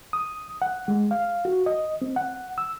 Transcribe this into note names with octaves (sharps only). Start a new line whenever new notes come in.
D#6
F#5
G#3
F5
F#4
D#5
C4
F#5
E6